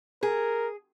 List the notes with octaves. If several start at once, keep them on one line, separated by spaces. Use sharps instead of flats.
G#4 A#4